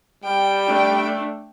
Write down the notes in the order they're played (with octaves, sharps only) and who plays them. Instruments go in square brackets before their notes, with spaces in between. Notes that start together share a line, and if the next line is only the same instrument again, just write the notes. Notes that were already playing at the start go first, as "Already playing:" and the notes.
[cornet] G3 [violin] G5
[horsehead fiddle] A3 D4